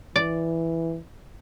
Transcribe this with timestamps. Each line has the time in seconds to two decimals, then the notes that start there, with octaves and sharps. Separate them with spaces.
0.16 E3 D5